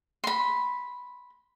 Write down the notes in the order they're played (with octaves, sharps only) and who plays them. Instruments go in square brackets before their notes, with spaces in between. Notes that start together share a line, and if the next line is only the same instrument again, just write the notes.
[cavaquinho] B5 C6